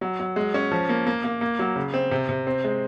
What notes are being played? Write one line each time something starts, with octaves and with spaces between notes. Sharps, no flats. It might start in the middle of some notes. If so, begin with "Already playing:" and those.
F#3
F#3
G#3
C#4
F3
A#3
A#3
A#3
A#3
F#3
C#3
C4
C3
C3
C4
G#3